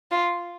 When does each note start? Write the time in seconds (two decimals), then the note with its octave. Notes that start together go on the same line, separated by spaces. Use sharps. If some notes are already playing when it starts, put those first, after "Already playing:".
0.11 F4